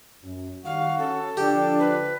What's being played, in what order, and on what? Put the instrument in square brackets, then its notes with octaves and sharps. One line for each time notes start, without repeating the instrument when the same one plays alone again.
[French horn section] F#2
[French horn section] D#3 G3 [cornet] F#4 [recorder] F5
[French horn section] C#4 [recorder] A4
[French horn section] D3 F3 [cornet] D4 [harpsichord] G4
[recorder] B4